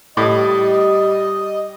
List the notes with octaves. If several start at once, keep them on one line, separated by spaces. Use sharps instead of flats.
A2 G3 D#5